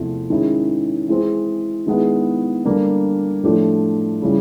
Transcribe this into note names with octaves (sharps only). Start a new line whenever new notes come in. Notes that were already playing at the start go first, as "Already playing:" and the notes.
Already playing: E2 C3 F3 A3
D#3 G#3 C#4 E4
E3 G#3 C4
D#3 G#3 B3 E4
D3 G3 A#3 D4
A2 F3 A3 D4 G4
C#3 E3 G3